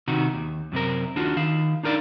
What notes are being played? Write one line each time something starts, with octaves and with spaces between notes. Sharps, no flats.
C3 D#3 F#4
D#2
F#2 C3 C4 A#4
D#2 D4 F4 F#4
D#3 F5
D4 D#4 A#4 D5 F5